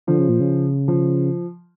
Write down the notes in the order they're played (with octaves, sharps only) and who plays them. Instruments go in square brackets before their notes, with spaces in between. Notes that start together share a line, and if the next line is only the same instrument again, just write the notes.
[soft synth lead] D3 [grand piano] F3
[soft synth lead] C#3
A#2
C#3
[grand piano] F3